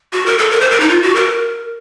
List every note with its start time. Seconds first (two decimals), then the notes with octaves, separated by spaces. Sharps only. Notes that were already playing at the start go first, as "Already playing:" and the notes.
0.13 F#4
0.26 A#4
0.38 A4
0.51 A#4
0.60 C5
0.70 A#4
0.80 D#4
0.89 F4
1.02 F#4
1.15 A#4